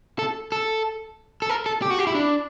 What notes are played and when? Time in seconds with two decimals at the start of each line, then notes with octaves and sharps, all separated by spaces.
0.19 A4
0.52 A4
1.42 A4
1.49 A#4
1.66 A4
1.82 G4
1.90 F#4
1.99 G4
2.07 E4
2.15 D4